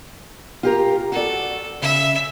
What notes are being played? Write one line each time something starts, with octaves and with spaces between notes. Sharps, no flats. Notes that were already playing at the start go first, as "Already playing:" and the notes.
F4 G4 A#4
F#4 A4 D5
C#3 E5